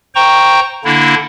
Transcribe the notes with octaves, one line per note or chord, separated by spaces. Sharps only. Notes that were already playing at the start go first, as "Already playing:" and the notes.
C5 G5 A#5 C#6
D3 A#3 D4 E4